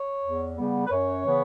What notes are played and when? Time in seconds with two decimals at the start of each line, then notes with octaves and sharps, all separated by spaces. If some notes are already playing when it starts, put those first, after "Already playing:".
Already playing: C#5
0.23 E2
0.57 C#3 G3 B3
0.86 B4
0.90 F#2 C#5
1.24 C#3 E3 B3